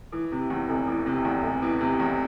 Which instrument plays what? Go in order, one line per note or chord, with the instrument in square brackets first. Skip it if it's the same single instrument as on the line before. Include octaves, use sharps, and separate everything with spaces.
[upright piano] E3
C3
E2
F1
E3
C3
E2
F1
E3
C3
E2